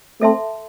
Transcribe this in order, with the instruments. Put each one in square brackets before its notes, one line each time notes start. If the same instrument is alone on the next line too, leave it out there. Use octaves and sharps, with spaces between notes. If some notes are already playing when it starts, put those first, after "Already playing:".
[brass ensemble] A3 C4 [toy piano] A4 E5 A5 C6